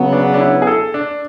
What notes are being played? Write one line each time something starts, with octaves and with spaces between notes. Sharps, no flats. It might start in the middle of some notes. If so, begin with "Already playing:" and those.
Already playing: C#3 F#3 B3
D4
D4
E4
G#4
A4
D4